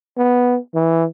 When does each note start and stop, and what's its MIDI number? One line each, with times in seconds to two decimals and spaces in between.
0.17 0.58 59
0.74 1.05 52